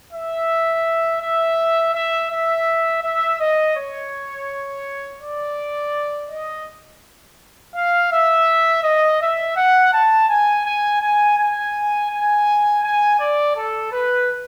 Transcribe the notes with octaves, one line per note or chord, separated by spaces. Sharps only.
E5
E5
E5
E5
E5
D#5
C#5
D5
D#5
F5
E5
D#5
E5
F#5
A5
G#5
G#5
G#5
G#5
G#5
G#5
D5
A4
B4